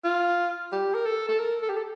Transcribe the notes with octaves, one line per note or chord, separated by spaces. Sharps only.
F4
G4
A#4
A4
A4
A#4
A4
G4
A4